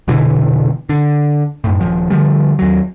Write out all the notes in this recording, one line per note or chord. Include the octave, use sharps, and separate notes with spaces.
F1 B2 D3 E3
D3
F#2 A2
D#1 F3
D3 F3 G3
D#2 F#3